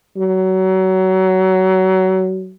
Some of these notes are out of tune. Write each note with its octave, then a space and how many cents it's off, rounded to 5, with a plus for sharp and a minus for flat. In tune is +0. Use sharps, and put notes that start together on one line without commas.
F#3 +25